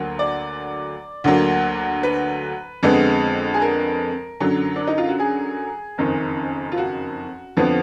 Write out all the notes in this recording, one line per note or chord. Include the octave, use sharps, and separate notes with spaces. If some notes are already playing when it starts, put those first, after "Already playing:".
Already playing: D2 D3 F#3 A#3
D5
D2 D3 F#3 A#3
B4
F2 D3 G#3 B3
G#4
A#4
F#2 D3 F#3
D4
D#4
F4
F#4
G#4
F#1 F2 D#3
F4
F#4
F2 D3 F3 B3